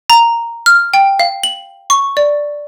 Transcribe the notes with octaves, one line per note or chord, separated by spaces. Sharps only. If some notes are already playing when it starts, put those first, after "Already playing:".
A#5
F6
G5
F5
F#7
C#6
D5